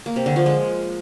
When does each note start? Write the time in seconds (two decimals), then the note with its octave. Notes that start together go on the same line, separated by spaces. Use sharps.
0.06 A#3
0.16 C3
0.26 D3
0.36 F3
0.46 G#3